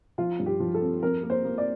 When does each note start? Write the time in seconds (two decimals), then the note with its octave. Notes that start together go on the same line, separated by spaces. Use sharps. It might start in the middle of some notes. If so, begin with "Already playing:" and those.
0.18 F3 F4
0.39 G2
0.46 G4
0.60 F3
0.74 A4
0.81 C4
1.03 F2 A#4
1.23 A#3
1.30 C5
1.45 A#3
1.58 D5